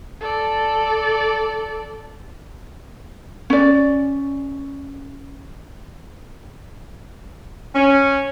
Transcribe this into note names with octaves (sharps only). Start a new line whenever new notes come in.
A4 D5
C#4 D5
C#4